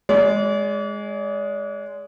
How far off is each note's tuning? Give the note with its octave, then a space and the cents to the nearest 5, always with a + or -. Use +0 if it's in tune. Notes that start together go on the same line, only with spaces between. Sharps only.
G#3 +0 D5 -40